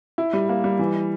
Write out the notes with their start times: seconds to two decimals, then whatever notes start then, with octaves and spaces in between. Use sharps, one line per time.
0.18 E4
0.33 G3
0.49 A#3
0.64 G3
0.79 E3